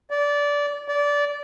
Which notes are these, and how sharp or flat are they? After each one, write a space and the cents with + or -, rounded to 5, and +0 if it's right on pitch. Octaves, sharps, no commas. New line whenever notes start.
D5 -20
D5 -20